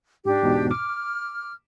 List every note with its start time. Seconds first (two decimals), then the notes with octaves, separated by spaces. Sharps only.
0.25 G#2 D4 G4
0.42 E2 G#2 B2
0.71 D6 F6